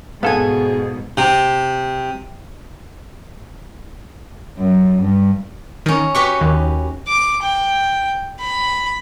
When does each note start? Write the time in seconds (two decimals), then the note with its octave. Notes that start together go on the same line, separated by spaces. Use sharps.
0.23 G#2 B2 B3 G#4 A4 F5 G#5
1.17 C3
4.58 F#2
5.02 G2
5.86 D#3 C#4 A#4
6.15 F#4 G4 B4 C#6
6.41 D#2
7.08 D6
7.42 G5
8.41 B5